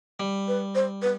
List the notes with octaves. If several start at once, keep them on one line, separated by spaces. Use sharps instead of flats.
G3
B4
C5
B4